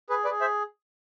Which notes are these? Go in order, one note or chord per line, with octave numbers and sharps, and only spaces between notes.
G#4 B4
B4 D5
G#4
C5 E5